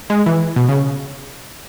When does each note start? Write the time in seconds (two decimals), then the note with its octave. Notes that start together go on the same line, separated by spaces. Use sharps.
0.10 G#3
0.26 E3
0.56 B2
0.69 C#3